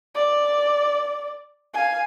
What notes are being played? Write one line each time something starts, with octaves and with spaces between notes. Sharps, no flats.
D5
F5 G#5